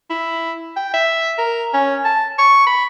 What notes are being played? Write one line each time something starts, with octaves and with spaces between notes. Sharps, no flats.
E4
G5
E5
A#4
C#4
A5
C#6
B5